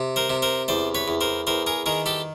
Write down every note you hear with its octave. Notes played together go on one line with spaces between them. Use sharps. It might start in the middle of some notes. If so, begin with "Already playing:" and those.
Already playing: C3
A#4 C5
C3
A#4 C5
E2 C5 D5
B4 C#5
E2
A#4 C5
E2 A#4 C5
G#4 A#4
D#3 G#4 A#4
G4 A4